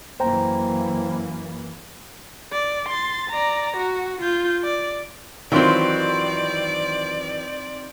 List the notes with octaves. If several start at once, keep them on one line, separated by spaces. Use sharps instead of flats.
F#2 E3 A#3 C5 G5 A#5
D5
C6 A6
D5 A#5
F#4
F4 G6
D5
D#3 E3 F#3 C4 F4 D5